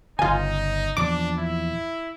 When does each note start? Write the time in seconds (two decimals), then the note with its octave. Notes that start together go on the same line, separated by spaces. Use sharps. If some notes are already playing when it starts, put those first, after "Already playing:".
0.19 G1 C#3 D#4 F4 G#5
0.97 E2 A#2 F3 D4 D6
1.38 E4